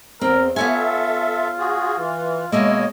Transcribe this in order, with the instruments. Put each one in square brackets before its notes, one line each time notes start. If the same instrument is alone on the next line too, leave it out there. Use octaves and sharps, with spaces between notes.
[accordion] E2 [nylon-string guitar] C4 [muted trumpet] A#4
[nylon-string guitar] B3 C#5 G#5 [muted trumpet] F4 [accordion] A4 E5
[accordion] F#4 G#4
E3
[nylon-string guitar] B2 G#3 A#3 [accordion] C#5 D#5 [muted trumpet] E5